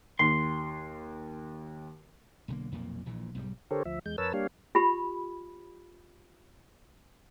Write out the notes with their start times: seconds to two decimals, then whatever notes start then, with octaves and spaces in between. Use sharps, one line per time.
0.19 D#2 C6
2.48 B1 D3 A#3
2.72 B1 F2 A#2 A#3
3.06 A#1 A#2 E3
3.35 B1 G#2 E3 G3
3.71 D3 G4 A4 A#4 C5 C#5
3.85 D2 F3 E5
4.06 E2 G#3 G6
4.18 F2 A#4 B4 C#5 A5 E6
4.33 G3 A#3 D4 G4 C#5 F5
4.75 F4 G4 B5